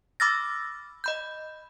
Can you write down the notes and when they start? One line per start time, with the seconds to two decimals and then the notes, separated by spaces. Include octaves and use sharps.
0.20 B5 D6 E6 F6 A6 A#6
1.04 D#5 B5 G6